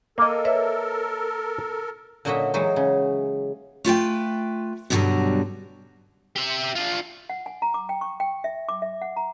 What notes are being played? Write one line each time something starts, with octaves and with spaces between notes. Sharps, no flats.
A#3 A4 A#4 D#5
B4 C#5 E5
A#2 D3 F#3 F#4 D#5 E5
E3 F#3 G#3 D#4 F#4
C#3
A3 F4 B4 G5
G2 B2 D3 E3 F#3 G3
G4 E5
D4 F4
F#5
G#5
A#5
D6
G5
C#6
G5
E5
D6
E5
F#5
A#5